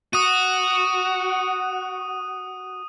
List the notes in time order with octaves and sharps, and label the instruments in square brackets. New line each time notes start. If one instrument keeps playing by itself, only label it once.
[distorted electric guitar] F#4 [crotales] D#6 D#7